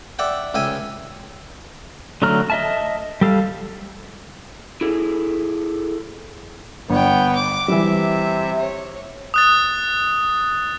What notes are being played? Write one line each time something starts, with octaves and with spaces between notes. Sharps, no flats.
D5 E5 F#5 G5
C#2 E5 G5 G#5
D3 F#3 A3 A#5 F6
D#5 E5 A5
G3 A4 F5
E4 G#4 A4
G1 B3 C#5 G5
D6
C3 E3 G3 E5
C#5
D#6 F#6 A6